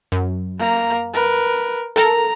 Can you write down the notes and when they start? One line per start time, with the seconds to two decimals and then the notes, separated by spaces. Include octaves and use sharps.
0.12 F#2
0.58 A#3 A#5
1.13 A#4 B4
1.96 A4 A#4 A#5